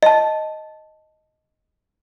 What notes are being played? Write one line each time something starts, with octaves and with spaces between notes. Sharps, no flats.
D#5 A5